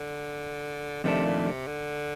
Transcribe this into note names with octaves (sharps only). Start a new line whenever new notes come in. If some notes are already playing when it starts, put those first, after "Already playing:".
Already playing: D3
F2 C3 D#3 A3 D4
A#2
C3
D3